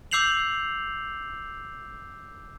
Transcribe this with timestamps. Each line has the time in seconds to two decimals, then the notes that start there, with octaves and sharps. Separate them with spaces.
0.11 D6 E6 G6 C7 F7 F#7